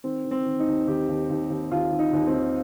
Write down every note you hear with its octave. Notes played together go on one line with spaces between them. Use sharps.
D#3 C4
D#3
C4
D#3
D#4
D#2
D#2 G4
D#2
D#2
D#2
D#2 F4
D#3
D#4
D#2
C4
D#3